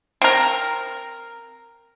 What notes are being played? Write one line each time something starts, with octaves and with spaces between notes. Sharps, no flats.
C4 A#4